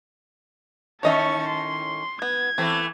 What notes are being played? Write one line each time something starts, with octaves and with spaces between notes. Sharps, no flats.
A2 D#3 C#4 C#5 D#5 E5 A5 C#6
C6
B3 G#6
E3 A3 B3 C4